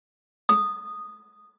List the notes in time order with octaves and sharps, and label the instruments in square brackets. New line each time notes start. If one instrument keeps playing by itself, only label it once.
[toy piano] D#6